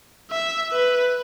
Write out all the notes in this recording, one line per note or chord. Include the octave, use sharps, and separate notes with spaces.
E5
B4